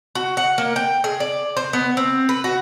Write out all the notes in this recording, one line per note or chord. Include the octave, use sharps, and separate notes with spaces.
F#4
F#5
A#3
G5
G#4
D5
C5
B3
C4
B4
F#4